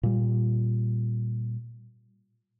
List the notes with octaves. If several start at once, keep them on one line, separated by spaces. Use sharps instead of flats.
A#2 G3